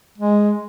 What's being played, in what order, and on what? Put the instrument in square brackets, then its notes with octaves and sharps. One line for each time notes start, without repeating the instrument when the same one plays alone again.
[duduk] G#3